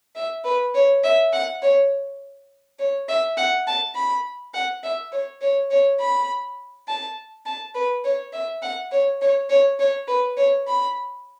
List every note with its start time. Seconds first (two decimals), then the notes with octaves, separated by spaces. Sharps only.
0.15 E5
0.45 B4
0.74 C#5
1.04 E5
1.33 F#5
1.62 C#5
2.79 C#5
3.08 E5
3.37 F#5
3.67 A5
3.95 B5
4.54 F#5
4.83 E5
5.12 C#5
5.41 C#5
5.71 C#5
6.00 B5
6.88 A5
7.46 A5
7.74 B4
8.04 C#5
8.33 E5
8.62 F#5
8.92 C#5
9.21 C#5
9.49 C#5
9.79 C#5
10.08 B4
10.37 C#5
10.67 B5